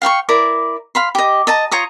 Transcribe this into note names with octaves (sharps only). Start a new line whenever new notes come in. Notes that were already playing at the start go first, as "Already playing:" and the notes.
F5 G5 C6 C#6
E4 A#4 D5 D6
F5 B5 C6
G4 D#5
D#5 A5 A#5
F4 C#5 A#5 D#6